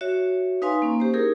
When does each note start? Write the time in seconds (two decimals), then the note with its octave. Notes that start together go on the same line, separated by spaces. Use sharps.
0.01 F#4 C#5 E5
0.62 D#4 B4 F5 G#5 C6
0.82 A#3 C#4
1.00 G4 C5
1.14 D#4 E4 G4 G#4 A#4